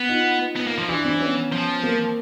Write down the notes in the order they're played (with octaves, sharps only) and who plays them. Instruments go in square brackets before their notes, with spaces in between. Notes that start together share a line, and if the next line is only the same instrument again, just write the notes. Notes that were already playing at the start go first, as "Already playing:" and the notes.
Already playing: [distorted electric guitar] B3
[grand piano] D#4 F4
[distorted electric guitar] B3
A#3
F3
[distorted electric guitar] E3 [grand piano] D4 E4
[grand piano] C4 D4
B3 C#4
[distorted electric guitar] F3
[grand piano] A#3 C4